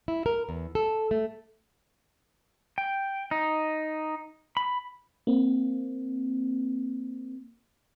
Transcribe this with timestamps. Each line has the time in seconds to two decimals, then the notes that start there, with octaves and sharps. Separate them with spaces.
0.08 E4
0.26 A#4
0.49 E2
0.75 A4
1.11 A3
2.78 G5
3.31 D#4
4.57 B5
5.27 A#3 C4